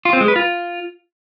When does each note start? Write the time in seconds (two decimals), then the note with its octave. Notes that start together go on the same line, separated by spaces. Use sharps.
0.05 F4
0.13 C4
0.21 G#3
0.28 B4
0.36 F4